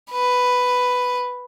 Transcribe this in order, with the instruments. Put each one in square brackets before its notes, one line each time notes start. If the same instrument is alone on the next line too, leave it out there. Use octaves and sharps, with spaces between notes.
[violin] B4